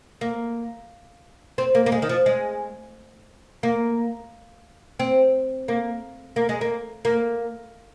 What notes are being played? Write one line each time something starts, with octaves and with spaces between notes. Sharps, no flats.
A#3
C4
A#3
A#3
G#3
D#3
F3
G#3
A#3
C4
A#3
A#3
G#3
A#3
A#3